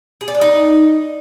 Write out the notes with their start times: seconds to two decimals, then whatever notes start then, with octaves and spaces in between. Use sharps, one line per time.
0.21 G#4
0.28 D5
0.35 D4
0.41 D#4